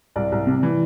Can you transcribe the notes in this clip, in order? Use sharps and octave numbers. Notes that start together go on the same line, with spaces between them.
C2 D5
C2
C3
E3